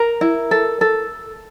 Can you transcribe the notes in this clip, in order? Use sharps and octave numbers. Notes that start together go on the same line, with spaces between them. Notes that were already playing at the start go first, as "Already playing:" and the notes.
Already playing: A#4 A#5
E4
A4
A4